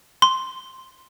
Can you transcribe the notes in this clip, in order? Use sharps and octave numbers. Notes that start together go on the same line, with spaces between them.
C6